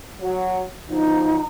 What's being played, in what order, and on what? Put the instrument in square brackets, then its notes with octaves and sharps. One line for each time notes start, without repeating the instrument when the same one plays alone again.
[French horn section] F#3
[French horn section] B2 D3 F3 [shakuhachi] D#4